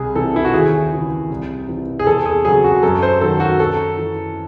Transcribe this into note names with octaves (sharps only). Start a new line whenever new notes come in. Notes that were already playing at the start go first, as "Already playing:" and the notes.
Already playing: C2 G#4
C3 E3 A4
E4
F#4
D#2 G#4
C#3 E3
C2
C3 E3
G#4
E2 A4
G#4
C#3 F#3 G#4
F#4
F#2 A4
C5
D#3 F#3 A4
F#4
F#2 A4
E3